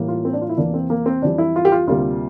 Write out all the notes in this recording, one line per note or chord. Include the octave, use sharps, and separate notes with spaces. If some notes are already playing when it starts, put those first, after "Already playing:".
Already playing: A2 E3 G3 A#3
F4
C4
D4
F4
E4
E2 C3 E3 A#3 D4
C4
A#3
C4
F2 E3 G3 D4
E4
F4
G4
F4
D2 C3 G3 A#3 F4